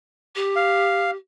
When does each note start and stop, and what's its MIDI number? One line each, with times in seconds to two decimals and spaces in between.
0.35 1.16 67
0.56 1.11 77